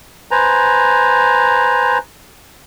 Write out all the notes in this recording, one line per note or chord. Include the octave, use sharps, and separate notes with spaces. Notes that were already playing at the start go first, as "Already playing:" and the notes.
B4 C5 G#5 A#5